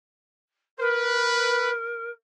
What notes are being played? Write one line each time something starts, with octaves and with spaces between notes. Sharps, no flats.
A#4 B4